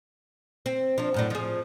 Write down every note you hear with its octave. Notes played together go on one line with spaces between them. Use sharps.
C4
F3 D4
F#2 A2 D4
F3 G#4